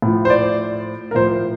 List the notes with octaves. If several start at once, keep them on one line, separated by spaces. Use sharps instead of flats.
A2 F3
C5
D5
A#4
A2 F3 C5